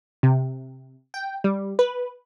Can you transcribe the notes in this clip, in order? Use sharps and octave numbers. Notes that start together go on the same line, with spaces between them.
C3
G5
G3
B4